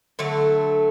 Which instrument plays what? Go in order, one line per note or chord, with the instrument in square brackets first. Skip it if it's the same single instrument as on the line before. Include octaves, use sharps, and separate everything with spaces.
[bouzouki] D3 F#3 A3